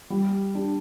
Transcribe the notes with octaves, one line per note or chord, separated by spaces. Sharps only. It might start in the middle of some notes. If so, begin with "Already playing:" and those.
G3
D4 G4